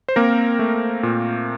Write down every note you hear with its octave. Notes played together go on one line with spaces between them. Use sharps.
C5
A#3 C4 A#4
A3
A#2